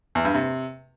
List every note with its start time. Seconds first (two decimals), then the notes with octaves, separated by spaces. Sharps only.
0.15 E2
0.25 G2
0.34 C3